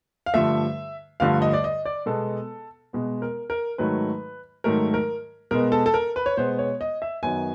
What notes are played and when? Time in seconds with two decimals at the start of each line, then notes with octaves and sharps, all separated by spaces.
0.26 F5
0.34 G2 D3 F3 A3 E5
1.20 G2 D3 F3 A3 F5
1.42 D#5
1.53 D5
1.64 D#5
1.85 D5
2.06 B2 G#3 B3 A4
2.93 B2 G#3 B3
3.22 A#4
3.50 A#4
3.78 G#2 D#3 F#3 A3 B4
4.64 G#2 D#3 F#3 A3 A#4
4.94 A#4
5.51 B2 G#3 B3 A#4
5.72 A4
5.86 A4
5.94 A#4
6.16 B4
6.26 C#5
6.37 B2 G#3 B3 C5
6.59 C#5
6.81 D#5
7.02 E5
7.23 F#2 D#3 F#3 B3 G#5